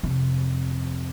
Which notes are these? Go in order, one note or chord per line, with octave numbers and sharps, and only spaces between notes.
F2 C3